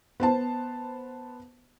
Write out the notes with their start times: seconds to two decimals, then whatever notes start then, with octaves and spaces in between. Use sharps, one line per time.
0.20 B3 C5 A5